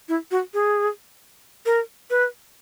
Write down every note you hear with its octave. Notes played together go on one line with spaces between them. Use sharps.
E4
F#4
G#4
A#4
B4